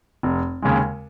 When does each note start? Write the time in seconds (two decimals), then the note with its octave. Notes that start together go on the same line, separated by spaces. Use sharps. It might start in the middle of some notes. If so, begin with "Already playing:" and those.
0.23 F1
0.62 D#2 C#3 G#3